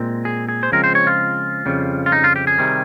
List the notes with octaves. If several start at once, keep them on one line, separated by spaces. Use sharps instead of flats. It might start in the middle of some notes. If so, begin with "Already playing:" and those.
Already playing: A#2 G#3 C4
G#4
G#4
C5
C#3 F3 G#3 C4 A#4
C5
C#5
F4
F2 C#3 G3
F4
D#4
F4
G4
G#4
C3 D#3 G3